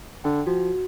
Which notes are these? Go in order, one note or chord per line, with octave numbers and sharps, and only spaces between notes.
D3 G5
F3 F#4